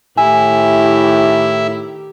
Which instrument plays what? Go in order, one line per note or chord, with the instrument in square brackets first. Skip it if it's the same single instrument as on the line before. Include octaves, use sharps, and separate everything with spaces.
[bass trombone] A2 [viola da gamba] D#3 G4 [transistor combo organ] E4 [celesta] G#5